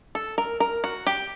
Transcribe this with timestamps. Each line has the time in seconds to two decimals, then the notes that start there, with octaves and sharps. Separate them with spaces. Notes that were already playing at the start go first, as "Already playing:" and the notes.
0.15 A4
0.38 A#4
0.60 A#4
0.84 F#4
1.07 G4